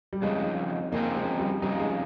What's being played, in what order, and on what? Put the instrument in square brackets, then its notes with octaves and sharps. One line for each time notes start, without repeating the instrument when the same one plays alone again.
[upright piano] G3
[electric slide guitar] F2 C#3 D#4 [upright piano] G#3
[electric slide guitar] F2 C#3 F3 C4 D#4 [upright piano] A#3
[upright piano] G#3
G3
[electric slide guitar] F2 C#3 D#4 [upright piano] G3
[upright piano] G#3